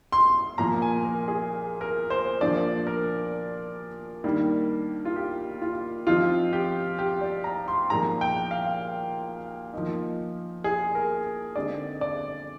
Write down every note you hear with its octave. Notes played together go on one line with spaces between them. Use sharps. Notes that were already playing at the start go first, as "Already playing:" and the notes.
C6
A#2 F3 A#3 A#5
G#5
A#4
G#4
A#4
C5
A#2 F3 A#3 D4 D5
A#4
D#3 G3 A#3 D4
F4
G4
F4
F3 C4 D#4 F4
G4
G4
D5
A#5
C6
A#2 F3 G#3 D#4 A#5
G5
F5
F3 A#3 D#4
G#4
A#4
D3 G#3 C4 D#4 D5
D5